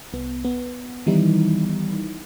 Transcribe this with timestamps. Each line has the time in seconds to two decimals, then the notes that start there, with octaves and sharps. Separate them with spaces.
0.13 C2 B3
0.45 B3
1.06 D#3 E3 G3 B3 D#4 E4